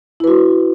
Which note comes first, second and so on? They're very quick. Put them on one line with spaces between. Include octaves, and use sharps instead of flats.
E4 B4 F#4